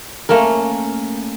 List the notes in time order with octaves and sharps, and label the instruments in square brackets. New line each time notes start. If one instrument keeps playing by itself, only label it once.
[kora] A3 A#3 C#4 A#4